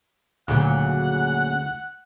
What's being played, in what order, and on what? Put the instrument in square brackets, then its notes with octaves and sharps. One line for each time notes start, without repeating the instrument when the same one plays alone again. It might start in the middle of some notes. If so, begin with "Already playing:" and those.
[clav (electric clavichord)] D2 [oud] A#2 C#3 F#3 [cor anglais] F#5